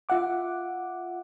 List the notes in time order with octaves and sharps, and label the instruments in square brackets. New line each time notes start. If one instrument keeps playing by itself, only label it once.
[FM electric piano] F4 E5 F#5 D6